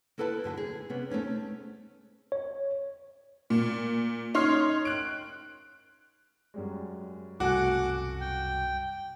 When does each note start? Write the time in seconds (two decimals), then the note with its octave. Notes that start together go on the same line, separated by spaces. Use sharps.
0.18 A#3 E4 A4 B4 G#5 A5
0.44 F#2 D3 G4 A4
0.57 G#4
0.90 C3 B3 C#4
1.10 A3 C4 C#4 D#4
2.32 C#5
3.50 A#2
4.34 C#4 D#4 C#5 C6 F6 C7
4.85 F#6 D7
6.54 F#2 G3 G#3
7.40 C2 F#2 B2 A3 F#4 F#5 G#5 D6
8.20 G5